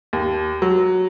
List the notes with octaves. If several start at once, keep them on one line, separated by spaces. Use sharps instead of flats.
D#2
F#3